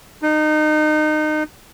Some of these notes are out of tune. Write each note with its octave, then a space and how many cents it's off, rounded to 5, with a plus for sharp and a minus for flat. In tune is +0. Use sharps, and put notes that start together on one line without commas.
D#4 -25